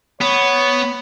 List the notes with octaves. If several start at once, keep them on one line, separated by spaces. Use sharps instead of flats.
B3 C#5